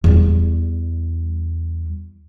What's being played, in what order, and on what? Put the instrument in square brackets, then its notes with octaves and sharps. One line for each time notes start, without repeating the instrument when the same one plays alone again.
[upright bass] E2 G3